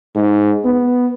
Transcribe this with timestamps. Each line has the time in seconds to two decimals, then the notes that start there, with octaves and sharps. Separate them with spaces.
0.15 G#2
0.65 B3